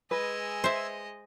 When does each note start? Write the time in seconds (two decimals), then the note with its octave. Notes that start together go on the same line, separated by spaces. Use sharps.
0.11 G#3 B4 D#5 G#5 E6
0.64 C5 E5